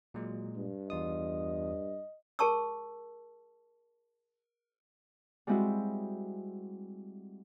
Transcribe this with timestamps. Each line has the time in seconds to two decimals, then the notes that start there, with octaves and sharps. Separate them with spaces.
0.14 A#2 F#3 G#3
0.56 G2
0.90 E2 F4 D#5 D#6
2.39 G#4 A#4 A5 C#6 E6
5.47 G3 G#3 C4 E4 F#4